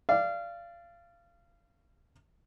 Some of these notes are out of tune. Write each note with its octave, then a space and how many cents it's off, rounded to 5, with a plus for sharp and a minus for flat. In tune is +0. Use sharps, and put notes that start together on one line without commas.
D5 +0 F5 -25